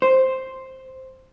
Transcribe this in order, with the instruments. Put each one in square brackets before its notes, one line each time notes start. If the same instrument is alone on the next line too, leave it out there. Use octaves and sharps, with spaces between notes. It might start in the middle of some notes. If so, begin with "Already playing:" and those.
[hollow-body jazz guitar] C5